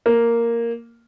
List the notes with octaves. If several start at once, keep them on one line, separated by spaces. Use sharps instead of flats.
A#3